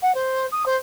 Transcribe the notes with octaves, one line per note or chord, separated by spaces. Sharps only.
F#5
C5
D#6
C5